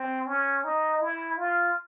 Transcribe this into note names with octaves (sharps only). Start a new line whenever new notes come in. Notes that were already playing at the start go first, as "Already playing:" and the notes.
Already playing: C4
C#4
D#4
E4
F4